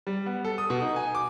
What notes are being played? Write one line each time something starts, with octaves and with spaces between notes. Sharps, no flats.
G3
B3
A4
D#6
B2
D#4
G#5
D6